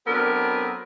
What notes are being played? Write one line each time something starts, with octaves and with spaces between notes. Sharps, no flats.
F#3 B3 C4 D4 A4 A#4